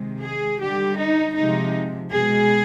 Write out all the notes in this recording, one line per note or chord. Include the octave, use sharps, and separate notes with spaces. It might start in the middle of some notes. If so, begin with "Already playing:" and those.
Already playing: C3 D#3 G#3
G#4
D3 G3 G4
D#4
C3 F3 G#3 D#4
B2 G#3 G#4